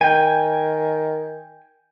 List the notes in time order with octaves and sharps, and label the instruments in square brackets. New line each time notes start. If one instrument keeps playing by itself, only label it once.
[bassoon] D#3 [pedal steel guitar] G5 G#5